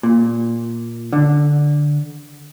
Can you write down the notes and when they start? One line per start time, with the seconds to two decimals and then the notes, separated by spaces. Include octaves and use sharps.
0.03 A#2
1.13 D3